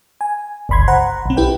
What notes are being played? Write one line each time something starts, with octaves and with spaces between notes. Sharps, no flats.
G#5
G1 C#2 B5 C6 G#6
C5 F#5 A#5 B5
B1 C4
E4 G4 B4 G5